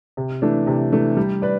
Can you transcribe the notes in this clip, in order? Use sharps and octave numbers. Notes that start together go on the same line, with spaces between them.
C3
E3 A3 D4
C3
E3 A3 D4
G3
B4 D5